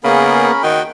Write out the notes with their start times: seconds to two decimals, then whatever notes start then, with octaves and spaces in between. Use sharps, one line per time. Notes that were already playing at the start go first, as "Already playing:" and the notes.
0.04 C#3 A#3 B3 C#4 G#4 A#4 B5
0.63 D#3 F#4 G5